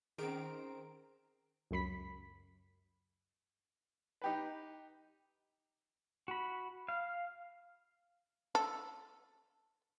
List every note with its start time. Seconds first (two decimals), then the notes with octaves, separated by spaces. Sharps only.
0.18 D#3 C4 C#4 G#4 A#4 D7
1.71 C#2 F#2 B5 B6
4.22 D#4 G4 B4
6.28 F#4 B5
6.88 F5
8.55 A4